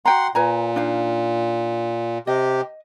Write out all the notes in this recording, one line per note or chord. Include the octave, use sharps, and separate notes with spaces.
F#4 F#5 G5 A#5 C6
A#2 B4 G#5 A#5
D4 D#4 F5
C3 G4 D#5